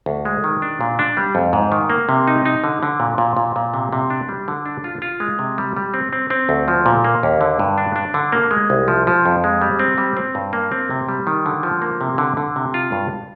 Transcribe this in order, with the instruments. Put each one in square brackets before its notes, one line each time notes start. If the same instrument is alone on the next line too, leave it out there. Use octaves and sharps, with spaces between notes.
[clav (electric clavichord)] D2
G#3
D#3
D4
A#2
D4
G3
F2
G#2
D#3
A#3
C3
D#4
D#4
D3
D3
A#2
A#2
A#2
A#2
C3
C3
D4
G3
D3
D4
F4
F4
G#3
C3
G3
G3
C4
C4
C4
D2
F3
A#2
A#3
D#2
D3
G2
D4
D4
D3
A#3
G#3
C2
F3
F3
F2
G#3
G3
C4
G3
C4
G2
A#3
C4
C3
G3
D#3
D3
F3
A#3
C3
D3
D3
C3
F4
G2